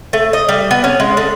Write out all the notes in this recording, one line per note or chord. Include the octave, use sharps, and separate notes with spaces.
A3
D#5
G3
B3
C#4
G#3
D3